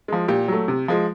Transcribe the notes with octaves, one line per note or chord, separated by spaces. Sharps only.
F3 G#3
A#2 G4
F#3 A3
C3
F3 G#3